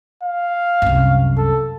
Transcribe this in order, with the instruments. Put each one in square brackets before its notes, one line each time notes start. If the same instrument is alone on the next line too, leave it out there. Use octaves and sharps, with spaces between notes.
[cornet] F5
[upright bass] C2 F#2
[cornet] A4